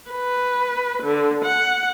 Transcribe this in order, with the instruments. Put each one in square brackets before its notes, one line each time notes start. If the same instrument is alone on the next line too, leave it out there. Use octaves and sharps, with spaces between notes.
[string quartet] B4
D3
F#5